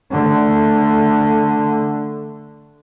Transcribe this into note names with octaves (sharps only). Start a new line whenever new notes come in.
D3 A3